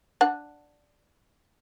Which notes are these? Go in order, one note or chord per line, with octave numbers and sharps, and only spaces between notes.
D4 F#5